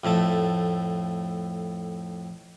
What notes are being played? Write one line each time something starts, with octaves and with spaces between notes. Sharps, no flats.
F2 A2 A3 A5